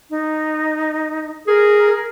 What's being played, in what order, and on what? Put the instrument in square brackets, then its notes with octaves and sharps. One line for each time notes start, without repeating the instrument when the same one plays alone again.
[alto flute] D#4
[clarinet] G#4 [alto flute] A#4